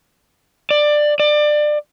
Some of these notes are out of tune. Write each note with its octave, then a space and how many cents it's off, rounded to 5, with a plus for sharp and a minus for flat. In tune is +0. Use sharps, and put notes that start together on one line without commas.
D5 +15
D5 +25